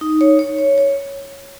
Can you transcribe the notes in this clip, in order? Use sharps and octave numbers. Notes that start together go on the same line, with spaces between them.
D#4
C#5
C#5
C#5
C#5